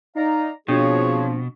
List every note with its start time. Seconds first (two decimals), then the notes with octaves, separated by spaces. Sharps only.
0.16 D#4 D5 F5 A#5
0.68 B2 F3 C4 D4 F4 F#4 G#4 C#5